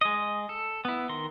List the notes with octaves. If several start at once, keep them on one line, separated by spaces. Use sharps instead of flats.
G#3 D#5
A4
B3 E4
D#3 A#4 C6